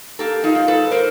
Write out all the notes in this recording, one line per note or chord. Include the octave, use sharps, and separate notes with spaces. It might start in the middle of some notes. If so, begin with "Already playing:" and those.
A#3 G4 A4
D#4 F4
G#2
A4 B4
A#3 A#4 C5